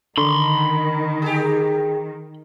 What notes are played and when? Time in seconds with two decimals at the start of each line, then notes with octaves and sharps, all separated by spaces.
0.18 D3 D#3 B5 C6
1.22 G4 G#4